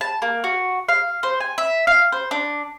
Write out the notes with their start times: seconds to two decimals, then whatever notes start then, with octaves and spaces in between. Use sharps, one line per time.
0.01 A5
0.22 A#3
0.44 F#4
0.89 F5
1.23 C5
1.40 G#5
1.58 E5
1.87 F5
2.12 C5
2.31 D4